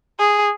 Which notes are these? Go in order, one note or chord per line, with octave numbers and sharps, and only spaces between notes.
G#4